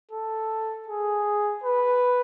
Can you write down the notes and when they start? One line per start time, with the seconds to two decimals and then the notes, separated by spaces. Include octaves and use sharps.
0.11 A4
0.88 G#4
1.64 B4